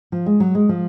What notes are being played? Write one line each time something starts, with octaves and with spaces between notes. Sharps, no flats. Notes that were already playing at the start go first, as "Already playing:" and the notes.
F3
G#3
F#3
G#3
F3